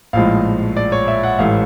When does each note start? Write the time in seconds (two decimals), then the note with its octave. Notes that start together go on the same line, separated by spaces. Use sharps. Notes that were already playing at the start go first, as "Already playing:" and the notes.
0.13 A#1 A2 F3 G#3 F5
0.77 D5
0.92 C#5
1.08 E5
1.23 F#5
1.39 A1 G#2 E3 A3 F5